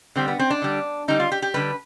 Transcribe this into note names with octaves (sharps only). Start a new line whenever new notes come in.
D3 G3 C4
B3
C4
D4
D3 G3
D3 G3 D#4
F4
G4
G4
D3 G3 B4